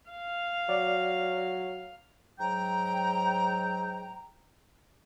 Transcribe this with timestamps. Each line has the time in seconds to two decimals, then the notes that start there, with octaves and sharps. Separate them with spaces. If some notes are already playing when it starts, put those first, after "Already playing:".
0.11 F5
0.69 F#3 D5
2.39 G#2 F#3 G5 A#5